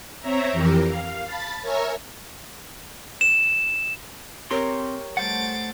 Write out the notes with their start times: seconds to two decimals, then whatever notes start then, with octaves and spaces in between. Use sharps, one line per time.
0.20 C4 C#5 E5 A#5
0.51 F2 E3 G4 A#4
0.87 F5
1.24 A5 B5 A6
1.61 A#4 C#5 E5 G#5 A#5
3.21 E7
4.51 C4 G4 A#4 C#5 C6
5.17 G3 A3 C5 F#5 A6 D7